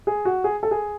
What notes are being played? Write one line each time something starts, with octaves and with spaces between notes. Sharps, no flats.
G#4
F#4
G#4
A4
G#4